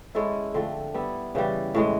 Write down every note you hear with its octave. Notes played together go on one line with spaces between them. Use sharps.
G#3 C#4 E4 A4
D3 F3 A3 C4
G3 B3 E4
C#3 E3 G3
A2 E3 G#3